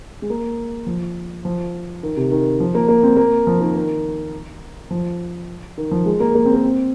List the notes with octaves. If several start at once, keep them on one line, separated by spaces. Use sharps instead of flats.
G#3
A#3
F3
F3
D#3
C3
D#3
F3
A#3
A#3
C4
A#3
F3
D#3
D#3
F3
D#3
F3
G#3
A#3
A#3
C4
A#3
C4